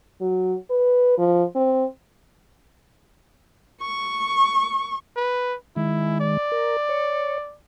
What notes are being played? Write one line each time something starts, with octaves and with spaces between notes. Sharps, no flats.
F#3
B4
F3
C4
C#6
B4
D#3 G#3 E4
D5
A#4
C#5